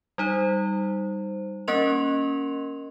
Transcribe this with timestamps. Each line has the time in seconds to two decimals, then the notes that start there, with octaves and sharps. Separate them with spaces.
0.18 G3 D#4 C5
1.68 A#3 C#4 A#4 D#5 C6 F7